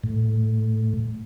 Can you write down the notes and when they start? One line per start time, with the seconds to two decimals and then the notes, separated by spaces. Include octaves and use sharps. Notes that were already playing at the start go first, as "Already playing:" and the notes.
0.04 A2